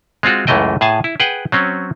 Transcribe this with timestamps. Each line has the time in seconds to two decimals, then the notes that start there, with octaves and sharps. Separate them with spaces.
0.23 G#3 C4 F4 F#4
0.47 C#2 F#2 E3 A3 D#5 G5
0.81 A2 G#4 G#5 A5
1.04 E4
1.20 G#4 B4 F#5 G5
1.52 F#3 C4 C#4